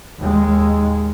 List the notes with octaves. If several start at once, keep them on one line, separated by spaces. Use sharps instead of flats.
D#2 G#3